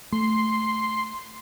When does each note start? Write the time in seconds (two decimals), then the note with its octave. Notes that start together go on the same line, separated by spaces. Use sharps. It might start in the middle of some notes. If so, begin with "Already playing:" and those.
0.12 A3 C6